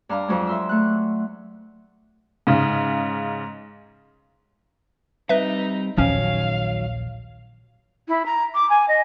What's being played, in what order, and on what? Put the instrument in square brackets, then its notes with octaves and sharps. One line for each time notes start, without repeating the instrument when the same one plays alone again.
[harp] G2 D4 F5 A#5
F2 F#3 G#3
E5 C6 E6
A3 F#6
[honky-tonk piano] G#2 C#3
[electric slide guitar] G3 C4 [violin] D#4 [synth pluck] B4 E5
[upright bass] A#1 D#2 [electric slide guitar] D#3 F#3 C#5 [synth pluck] F3 C#4 [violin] F5
[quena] E4
A#5
D6
G#5
D#5